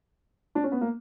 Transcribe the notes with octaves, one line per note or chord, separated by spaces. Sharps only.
D4
C#4
B3
A#3